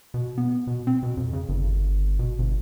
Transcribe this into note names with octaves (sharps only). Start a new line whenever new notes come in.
B2
B3
B2
C4
B2
F2
C#3
G1
B2
G1